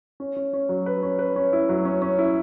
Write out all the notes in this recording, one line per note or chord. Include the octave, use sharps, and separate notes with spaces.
C#4
C#4
C#4
F#3
B4
C#4
B4
C#4
E4
F#3
C#4
C#4
E4